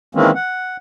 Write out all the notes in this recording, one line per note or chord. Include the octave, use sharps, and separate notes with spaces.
D#3 E3 G#3 A#3 C4 C#4
F#5